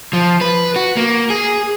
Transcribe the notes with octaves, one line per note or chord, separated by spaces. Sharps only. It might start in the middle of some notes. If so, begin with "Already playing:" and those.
F3
B4
F#4
A#3
G#4